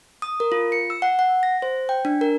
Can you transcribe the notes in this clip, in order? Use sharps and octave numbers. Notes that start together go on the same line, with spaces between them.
D#6
A#4
F4
C#7
E6
F#5
F#5
A#6
C5
G5
D4
A#4